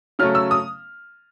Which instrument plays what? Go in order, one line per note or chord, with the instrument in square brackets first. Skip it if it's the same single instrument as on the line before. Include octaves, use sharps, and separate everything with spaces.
[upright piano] C#3 F#3 A3 C#4 F6
E6
D#6